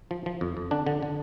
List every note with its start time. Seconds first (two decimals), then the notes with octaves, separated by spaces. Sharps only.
0.11 F3
0.26 F3
0.41 F2
0.57 F2
0.71 D3 D4
0.86 D3
1.03 D3